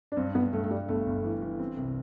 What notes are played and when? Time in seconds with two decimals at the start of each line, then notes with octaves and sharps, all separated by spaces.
0.12 D4
0.17 G2 C4
0.35 G2 B3
0.53 G2 A3
0.64 A3
0.70 G2 G3
0.88 G1 A3
1.06 G1
1.24 E3
1.42 E3
1.59 C4
1.77 C2